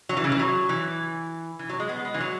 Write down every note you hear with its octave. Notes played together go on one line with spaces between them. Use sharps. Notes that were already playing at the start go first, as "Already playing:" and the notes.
F#3
E3
C#3
E3
F#3
E3
E3
F#3
G#3
B3
G#3
E3
F#3